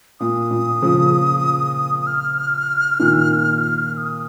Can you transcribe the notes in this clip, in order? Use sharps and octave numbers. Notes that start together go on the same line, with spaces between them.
A#2 D#6
A#2
C#3 F3
F6
A#2 D#3
F6
D#6